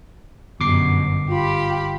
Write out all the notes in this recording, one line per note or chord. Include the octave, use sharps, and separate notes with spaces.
G1 F#2 B2 D6 C7
F4 G4 B5